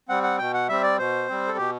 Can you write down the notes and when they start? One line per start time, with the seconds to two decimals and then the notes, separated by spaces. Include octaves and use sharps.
0.09 G3 C4 F#5
0.23 F#5
0.38 B2 G5
0.54 F#5
0.69 G3 C4 E5
0.83 D5
0.98 B2 C5
1.28 G3 C4
1.48 A4
1.57 B2 G4